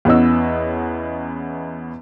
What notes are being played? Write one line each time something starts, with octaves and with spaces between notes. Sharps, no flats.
E2 B3 C#4 D#5 E6